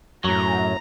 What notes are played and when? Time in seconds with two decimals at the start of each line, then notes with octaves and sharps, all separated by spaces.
0.24 F#2 A2 F#3 A#5